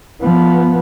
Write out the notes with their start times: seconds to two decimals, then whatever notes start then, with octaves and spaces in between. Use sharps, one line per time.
0.21 F3 B3